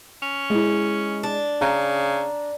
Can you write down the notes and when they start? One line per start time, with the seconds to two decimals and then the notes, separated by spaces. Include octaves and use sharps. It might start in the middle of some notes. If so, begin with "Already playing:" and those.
0.22 C#4
0.50 G#3 E4
1.23 D4
1.61 C#3 A#5